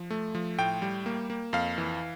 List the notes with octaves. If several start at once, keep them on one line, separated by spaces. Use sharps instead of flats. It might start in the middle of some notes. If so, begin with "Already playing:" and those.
Already playing: F3
A3
F3
A2 G5
G3
A#3
A#3
F2 F5
E3